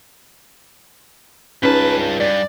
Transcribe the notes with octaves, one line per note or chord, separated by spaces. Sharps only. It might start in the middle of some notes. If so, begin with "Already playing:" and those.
C#2 G2 C#4 D#4 B4 A5
G2 D5